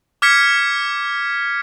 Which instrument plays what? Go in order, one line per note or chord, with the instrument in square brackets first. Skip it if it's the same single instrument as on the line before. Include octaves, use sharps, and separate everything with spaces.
[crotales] D6 F6 G#6 B6 C#7